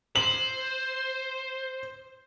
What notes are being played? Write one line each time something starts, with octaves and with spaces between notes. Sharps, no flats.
C5 F#7